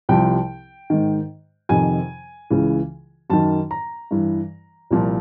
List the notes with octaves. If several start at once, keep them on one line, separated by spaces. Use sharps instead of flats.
C2 C3 F3 G5
G#2 D#3
F2 C3 D#3 G#5
C#2 C#3 E3
F#2 D#3 A5
A#5
G2 E3
C2 A#2 F3